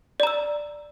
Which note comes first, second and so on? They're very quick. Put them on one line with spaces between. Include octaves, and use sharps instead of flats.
D5 A#5 E6